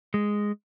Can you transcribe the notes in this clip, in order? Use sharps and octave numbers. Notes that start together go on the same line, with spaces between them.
G#3